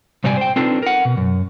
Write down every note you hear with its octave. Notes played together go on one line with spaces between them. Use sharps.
G#2 C3 G3 G4 D5 G#5
C5 G5
C4 D4 D#4 F4 A4 B4
A#4 F#5
B2
F#2